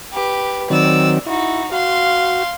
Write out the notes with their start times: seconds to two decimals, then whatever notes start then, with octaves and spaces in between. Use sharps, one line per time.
0.12 G4 B4
0.70 D#3 F#3 C4 D5 E6
1.26 D#4 E4 F#4
1.72 F#4 F5 C6